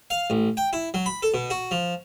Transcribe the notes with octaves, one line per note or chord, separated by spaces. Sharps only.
F5
A1
G5
E4
F#3
B5
A4
B2
F#4
F3